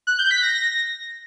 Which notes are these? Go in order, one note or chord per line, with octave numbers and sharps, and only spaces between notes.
F#6
G6
B6
A#6
A#6